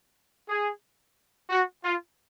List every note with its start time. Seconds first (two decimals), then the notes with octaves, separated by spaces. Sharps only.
0.48 G#4
1.50 F#4
1.84 F4